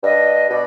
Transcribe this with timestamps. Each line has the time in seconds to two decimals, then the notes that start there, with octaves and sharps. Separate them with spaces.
0.03 G2 D#5
0.50 B2 D5